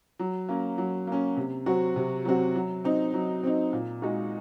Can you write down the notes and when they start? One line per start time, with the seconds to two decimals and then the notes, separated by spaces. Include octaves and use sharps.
0.19 F#3
0.49 A#3 C#4
0.78 F#3
1.07 A#3 C#4
1.37 C3
1.66 F#3 C4 F#4
1.96 C3
2.25 F#3 C4 F#4
2.56 F#3
2.84 C4 D#4
3.14 F#3
3.43 C4 D#4
3.73 A#2
4.02 G#3 D#4 F#4